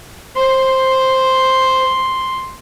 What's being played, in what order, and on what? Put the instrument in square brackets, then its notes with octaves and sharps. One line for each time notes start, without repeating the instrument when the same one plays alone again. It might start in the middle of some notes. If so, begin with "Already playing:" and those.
[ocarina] C5 [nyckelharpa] C6